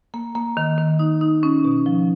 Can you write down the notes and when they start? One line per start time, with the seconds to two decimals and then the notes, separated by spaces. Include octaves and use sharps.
0.14 A#3
0.35 A#3
0.57 D#3
0.78 D#3
0.99 D#4
1.21 D#4
1.43 C#4
1.64 B2
1.86 F3